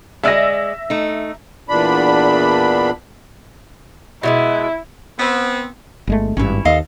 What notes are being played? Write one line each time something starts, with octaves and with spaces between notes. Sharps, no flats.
G#3 D5 E5 G#5 E6 A#6
A3 D#4
E2 A#2 D4 B5
B2 F#3 G#3 E4
B3 C4
G1 G#3 A3
G#1 G2 C#4 E4
D#2 A4 D#5 F5